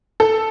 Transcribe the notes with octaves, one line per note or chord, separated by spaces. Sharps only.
A4